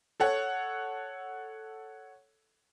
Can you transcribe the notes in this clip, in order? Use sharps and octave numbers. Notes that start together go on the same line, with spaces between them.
A4 C#5 F#5